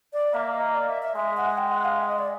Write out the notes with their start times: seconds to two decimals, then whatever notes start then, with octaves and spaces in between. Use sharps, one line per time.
0.13 D5
0.34 A#3 E5
0.54 D#5
0.74 D5
0.89 E5
1.03 E5
1.16 G#3 E5
1.37 F#5
1.57 G5
1.71 F#5
1.85 F5
1.99 E5
2.08 D#5
2.19 D5